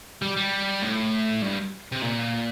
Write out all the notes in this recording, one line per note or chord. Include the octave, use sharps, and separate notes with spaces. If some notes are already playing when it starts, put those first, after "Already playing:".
G3
G3
A2
G2
C3
A#2